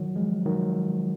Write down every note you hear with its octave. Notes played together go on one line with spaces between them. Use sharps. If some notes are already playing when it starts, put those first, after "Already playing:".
Already playing: D#3 F#3
F3 G#3
D#3 F#3